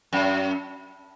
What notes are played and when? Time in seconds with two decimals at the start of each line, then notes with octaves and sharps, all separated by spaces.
0.13 F#2